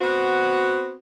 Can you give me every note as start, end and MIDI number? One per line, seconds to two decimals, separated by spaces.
0.01 0.95 59
0.01 0.95 60
0.01 0.95 66